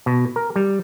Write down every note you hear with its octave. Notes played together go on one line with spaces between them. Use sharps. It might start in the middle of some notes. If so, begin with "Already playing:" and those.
B2
A#4
G3